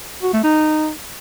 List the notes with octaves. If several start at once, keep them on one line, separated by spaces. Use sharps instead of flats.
F#4
A3
D#4